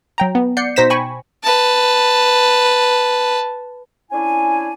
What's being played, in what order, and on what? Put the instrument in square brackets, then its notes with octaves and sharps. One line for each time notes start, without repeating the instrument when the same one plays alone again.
[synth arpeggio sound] F#3 G5 A#5
B3
D5 F#5 G6 C7 C#7
B2 D#4 C5 A#6 B6 E7
G5 G#5 B5 C#6
[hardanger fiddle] B4 A5
[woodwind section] C#4 D4 E4 G#5